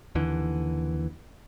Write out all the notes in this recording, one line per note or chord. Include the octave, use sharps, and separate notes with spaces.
D#2 D3 E3